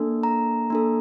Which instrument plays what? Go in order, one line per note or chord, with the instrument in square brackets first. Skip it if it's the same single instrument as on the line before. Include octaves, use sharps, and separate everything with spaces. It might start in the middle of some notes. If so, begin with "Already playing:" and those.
Already playing: [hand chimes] A#3 D4 A4
A#5
A#3 D4 A4